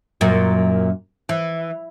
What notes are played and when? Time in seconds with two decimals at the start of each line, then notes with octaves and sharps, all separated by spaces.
0.21 F#2 A#2
1.29 E3